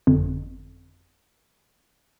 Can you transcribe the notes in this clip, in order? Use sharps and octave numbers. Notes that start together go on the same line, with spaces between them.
G1 F2